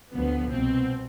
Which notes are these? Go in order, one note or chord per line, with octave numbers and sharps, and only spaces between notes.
D2 D3 F3 B3
C2 B2 C4